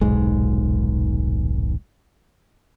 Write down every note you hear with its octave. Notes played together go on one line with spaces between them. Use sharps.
D#1 B1 G#2 G#3